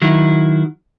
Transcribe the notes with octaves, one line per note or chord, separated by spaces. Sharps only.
D#3 F#3 E4